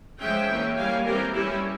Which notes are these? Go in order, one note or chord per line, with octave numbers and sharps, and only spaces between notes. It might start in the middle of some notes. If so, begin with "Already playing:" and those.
F3 G#3 C#4 E5 G5
E3 A#3 C#4
G3 A#3 C#4 F5 G#5
E3 G3 C4 G4 A#4
G3 C#4 E4 G4